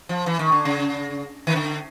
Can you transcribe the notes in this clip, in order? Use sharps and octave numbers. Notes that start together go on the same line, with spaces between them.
F3
E3
D#3
D3
C#3
D#3
D3